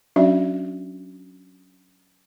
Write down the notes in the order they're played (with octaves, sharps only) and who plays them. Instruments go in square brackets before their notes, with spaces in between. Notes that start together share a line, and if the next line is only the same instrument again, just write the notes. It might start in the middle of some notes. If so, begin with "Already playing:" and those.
[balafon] F#3 C#4 D4 F#4 D5 E5